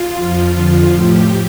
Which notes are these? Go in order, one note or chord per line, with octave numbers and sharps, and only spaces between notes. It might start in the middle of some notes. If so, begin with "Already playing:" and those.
Already playing: F4
F2 F3
F2 D3 F3 F4
A2 F3 G4